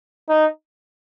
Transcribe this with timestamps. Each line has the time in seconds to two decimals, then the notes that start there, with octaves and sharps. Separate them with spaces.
0.29 D#4